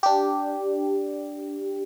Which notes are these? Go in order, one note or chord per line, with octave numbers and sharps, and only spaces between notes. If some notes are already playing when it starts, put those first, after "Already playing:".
D4 G4